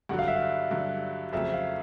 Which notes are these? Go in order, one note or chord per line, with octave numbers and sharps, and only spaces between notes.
G2 D3 F#3 F#5
F5
E5
F5
G2 D3 F#3
F2 C#3 F#3 A3 C4 E5
F5